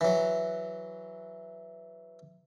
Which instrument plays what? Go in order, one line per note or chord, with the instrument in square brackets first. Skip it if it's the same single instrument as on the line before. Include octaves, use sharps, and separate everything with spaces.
[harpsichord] E3 F#3